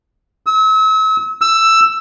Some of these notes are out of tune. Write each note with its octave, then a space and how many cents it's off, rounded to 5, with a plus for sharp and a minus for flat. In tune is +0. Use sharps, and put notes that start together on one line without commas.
E6 -40
E6 +10